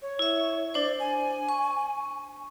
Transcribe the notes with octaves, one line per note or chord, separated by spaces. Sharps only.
C#5
E4 E5
D4 C5 D5
G#5
C#6